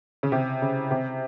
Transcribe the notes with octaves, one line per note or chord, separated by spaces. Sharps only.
C#3
C3
C#3
C3